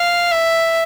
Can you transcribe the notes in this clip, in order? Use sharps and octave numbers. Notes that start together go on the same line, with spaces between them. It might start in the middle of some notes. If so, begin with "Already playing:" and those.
Already playing: F5
E5